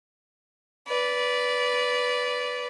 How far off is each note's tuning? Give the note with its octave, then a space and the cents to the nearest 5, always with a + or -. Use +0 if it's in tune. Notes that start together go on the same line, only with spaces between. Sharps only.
B4 +0 D5 -20